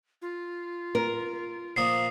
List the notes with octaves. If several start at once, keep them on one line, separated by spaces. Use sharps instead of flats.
F4
A#4
A#2 F3 A#3 D#6 C7